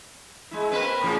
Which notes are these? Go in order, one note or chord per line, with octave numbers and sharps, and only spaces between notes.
G#3 E4
A#3 C4 B4
A2 C#3 F3